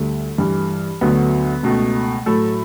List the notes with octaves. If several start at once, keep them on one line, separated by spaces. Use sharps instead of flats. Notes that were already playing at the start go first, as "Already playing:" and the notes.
Already playing: D2 D3 G3 A3
G2 E3 G3
D2 D3 F#3 A3 B3
C#2 B2 A3
A2 F#3 A3 A4